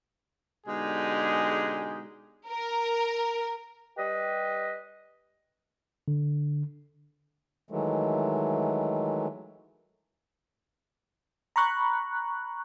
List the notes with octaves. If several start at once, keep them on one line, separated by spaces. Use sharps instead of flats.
B2 D3 G#3 D#4 G4 G#4
A#4
G3 G4 B4 D#5
D3
D#3 E3 F#3 G#3 A3
A#5 B5 C#6 F#6